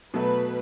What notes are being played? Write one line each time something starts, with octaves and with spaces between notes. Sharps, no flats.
B2 F#3 A3 B4